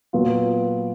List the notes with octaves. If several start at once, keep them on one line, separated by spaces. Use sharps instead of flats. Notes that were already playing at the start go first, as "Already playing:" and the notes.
A#2 F#3 B3 F4